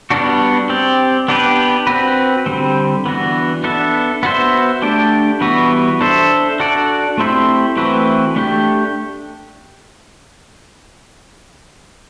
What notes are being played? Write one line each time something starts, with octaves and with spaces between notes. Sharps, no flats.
G3 B3 D4 F#4
C4 G4 D5
B3 D4 G4 B4
C4 F#4 B4
D3 G3 C4
E3 B3 D4 F#4
B3 D4 A4 E5
B3 F#4 C5 E5
A3 D4 G4 D5
E3 G3 B3 F#4 B4
D4 A4 C5 E5
D4 F#4 A4 D5
A3 C4 E4 G4 C5
E3 A3 C4 F#4 B4
A3 D4 G4